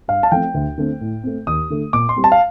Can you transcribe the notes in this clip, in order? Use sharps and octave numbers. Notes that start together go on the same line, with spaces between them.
G2 F5
A5
F3 A3 C4 G5
D2
D3 A3 C4
A2
A3 C4
D#2 D#6
D3 A3
A#2 D6
C6
G3 C4
A5
F5